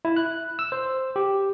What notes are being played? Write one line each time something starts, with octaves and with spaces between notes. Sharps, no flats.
E4
F#6
E6
C5
G4